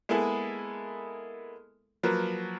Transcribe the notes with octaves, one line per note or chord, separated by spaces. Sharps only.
G#3 A#3 B3 E4 G#4 A4
F3 F#3 A#3 B4